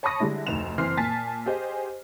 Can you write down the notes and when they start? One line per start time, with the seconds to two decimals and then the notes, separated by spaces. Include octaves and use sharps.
0.03 C#5 A5 B5 C#6 D#6 A#6
0.20 D3 G3 G#3 E4
0.47 F1 D2 D#4 E7 F7
0.78 F#1 E3 C4 C6 F6 C7
0.97 A#2 G#5 A5 A6 B6
1.46 G4 G#4 C5 D#5 G#5